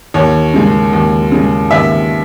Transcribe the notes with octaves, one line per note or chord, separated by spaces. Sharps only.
D#2 C#5
C#3 G#3
D#2
C#3 G#3
D#2 E5